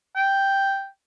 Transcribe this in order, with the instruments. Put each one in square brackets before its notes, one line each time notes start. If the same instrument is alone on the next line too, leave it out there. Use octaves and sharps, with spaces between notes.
[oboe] G5